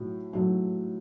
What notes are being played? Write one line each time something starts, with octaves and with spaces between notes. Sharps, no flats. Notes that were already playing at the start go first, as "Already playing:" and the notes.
Already playing: A2 F#3 A3
A2 F#3 A3